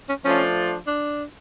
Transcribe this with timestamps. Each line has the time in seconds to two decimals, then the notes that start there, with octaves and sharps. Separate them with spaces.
0.09 C#4
0.25 F3 A3 C#4 D4 F4
0.87 D4